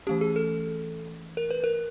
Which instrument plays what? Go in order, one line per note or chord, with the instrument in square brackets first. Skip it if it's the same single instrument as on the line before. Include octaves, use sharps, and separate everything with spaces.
[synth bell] E3 A3 C#4 G4
G#4
A4
A#4
B4
A#4